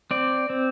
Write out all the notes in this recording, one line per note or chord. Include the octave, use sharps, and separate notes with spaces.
C4 D5
C4